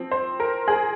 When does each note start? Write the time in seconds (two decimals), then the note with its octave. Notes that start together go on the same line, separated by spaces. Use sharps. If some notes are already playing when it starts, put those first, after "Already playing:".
Already playing: F3 C4
0.11 C5
0.40 A#4
0.68 G#4